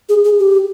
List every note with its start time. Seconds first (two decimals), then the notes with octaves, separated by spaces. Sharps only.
0.09 G#4
0.24 G#4
0.39 G4